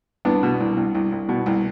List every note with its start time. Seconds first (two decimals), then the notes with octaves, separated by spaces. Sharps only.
0.25 C2 B3 D4
0.43 B2
0.60 C2
0.77 C2
0.95 C2
1.12 C2
1.29 B2
1.46 C2